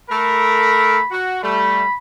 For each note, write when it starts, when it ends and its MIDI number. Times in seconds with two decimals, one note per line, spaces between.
0.10 0.99 57
0.10 0.99 69
0.10 0.99 70
0.10 1.14 83
1.11 1.41 66
1.43 1.83 55
1.43 1.83 57
1.43 1.98 83